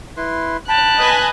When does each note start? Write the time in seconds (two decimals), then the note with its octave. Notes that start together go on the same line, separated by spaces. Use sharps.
0.17 E4 B4 C6
0.68 G5 A5 B5 F#6
0.98 B4 D#5 G#5